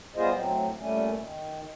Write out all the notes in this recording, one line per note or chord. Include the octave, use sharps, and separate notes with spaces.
G3 B3 F4 G#4 C5 D#5
A2 F#3 C4
A#2 G3 A3 C#4
D#3